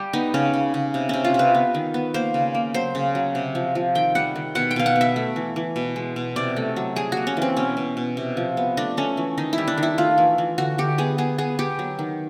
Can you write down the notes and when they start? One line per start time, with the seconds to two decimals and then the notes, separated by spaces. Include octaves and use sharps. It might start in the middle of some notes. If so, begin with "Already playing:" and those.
Already playing: G3 G4
0.13 B3 D#4
0.34 C#3 C#4
0.53 C#3
0.74 C#3
0.94 C3
1.09 C3 C#4
1.25 F4
1.34 C3 B4
1.55 B3
1.74 D#3
1.94 B3
2.14 A#3 C5
2.34 C#3
2.55 A#3
2.74 F#3 C5
2.95 C#3
3.15 F#3
3.35 C3
3.55 F3
3.75 F3
3.95 D#3 G5
4.15 G3 F#5
4.35 D#3
4.55 B2 F#5
4.71 G5
4.76 B2 F5
4.86 F#5
4.96 B3
5.01 E5
5.16 A3
5.36 E3
5.56 E3
5.76 B2
5.96 G#3
6.16 B2
6.36 C3 D5
6.56 A3
6.76 F#3
6.96 G3 G#4
7.12 A#3 F#4
7.27 C#4
7.37 E3 C4
7.57 B2 C#4
7.77 B2
7.97 B2
8.17 C3
8.37 F3
8.57 B3
8.77 A3 D4
8.97 A3 C#4
9.17 E3
9.38 D#3 D#4
9.53 E4
9.58 G3
9.68 D4
9.78 D#3
9.83 E4
9.98 A3 F4
10.18 E3
10.38 E3
10.58 D3 F#4
10.78 D3 G4
10.98 B3 G#4
11.18 B3 G#4
11.38 B3 G#4
11.59 B3 G4
11.79 F#3
11.99 D#3